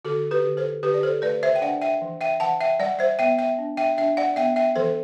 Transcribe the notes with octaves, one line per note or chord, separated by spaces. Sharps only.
D3 F#4 A4
G4 B4
D3
A4 C5
D3 G4 B4
D5
A4 C5
A3 B4 D5
C5 E5
G5
D4 D5 F#5
E5 G5
E3
E5 G5
E3 F#5 A5
E5 G5
G3 D5 F#5
C5 E5
B3 E5 G5
E5 G5
D4
E5 G5
D4 E5 G5
D5 F#5
B3 E5 G5
E5 G5
E3 A4 C5